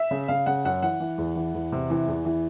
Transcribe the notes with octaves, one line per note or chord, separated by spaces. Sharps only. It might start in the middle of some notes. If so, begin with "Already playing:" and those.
Already playing: E5
C#3
C#3 F5
C#3 F#5
F#2 F#5
E3 F#5
E3
E2
E3
E2
C3
E3
E2
E3